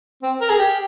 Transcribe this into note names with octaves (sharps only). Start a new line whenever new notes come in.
C4
A#4
G#4
G4